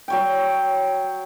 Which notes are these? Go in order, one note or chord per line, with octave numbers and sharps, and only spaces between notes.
F#3 C#5 G5